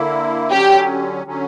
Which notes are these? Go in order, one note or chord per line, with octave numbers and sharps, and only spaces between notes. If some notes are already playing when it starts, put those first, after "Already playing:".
Already playing: D3 A#3 E4
D3 F#3 C#4 G4
D3 F#3 C#4